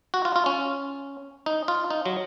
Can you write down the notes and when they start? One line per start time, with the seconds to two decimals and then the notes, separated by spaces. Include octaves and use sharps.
0.14 F#4
0.25 F4
0.36 F4
0.46 C#4
1.46 D#4
1.68 F4
1.90 D#4
2.06 F#3